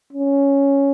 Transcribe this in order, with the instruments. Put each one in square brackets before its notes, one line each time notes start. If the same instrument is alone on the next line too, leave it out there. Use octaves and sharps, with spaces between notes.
[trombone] C#4